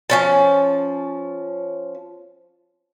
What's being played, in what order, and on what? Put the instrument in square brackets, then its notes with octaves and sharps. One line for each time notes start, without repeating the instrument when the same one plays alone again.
[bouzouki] F3 C#4 A5